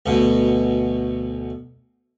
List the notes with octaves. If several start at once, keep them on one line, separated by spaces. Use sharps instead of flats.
D2 B2